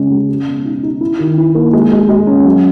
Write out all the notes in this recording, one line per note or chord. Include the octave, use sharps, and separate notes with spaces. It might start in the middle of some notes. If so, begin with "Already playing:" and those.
Already playing: C#3 G#3 C#4
G#3
G#3
B2
D#4
D#4
E4
D#3
E4
A#3
G#3
G#3
G#3
C#4
F#3